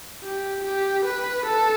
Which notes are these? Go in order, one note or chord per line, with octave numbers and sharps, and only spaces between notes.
G4
G4
B4
A4